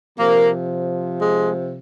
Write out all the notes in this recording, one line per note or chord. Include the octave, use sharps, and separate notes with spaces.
C3 F3 A#3
G#3